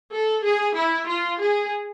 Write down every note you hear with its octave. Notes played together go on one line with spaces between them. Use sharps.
A4
G#4
E4
F4
G#4